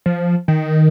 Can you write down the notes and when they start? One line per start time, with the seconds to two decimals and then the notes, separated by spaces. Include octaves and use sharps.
0.06 F3
0.48 D#3